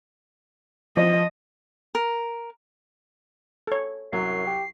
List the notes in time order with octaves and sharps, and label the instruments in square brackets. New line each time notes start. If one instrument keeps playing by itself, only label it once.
[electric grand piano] F3 [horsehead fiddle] D#5
[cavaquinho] A#4
[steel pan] A4 C#5
[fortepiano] C2 F#3 [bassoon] F#2 [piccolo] C7
[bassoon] G4